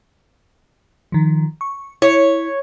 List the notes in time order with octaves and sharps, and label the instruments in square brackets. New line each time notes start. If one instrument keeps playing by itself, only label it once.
[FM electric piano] D#3 F3
C#6
[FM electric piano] E4 [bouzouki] C#5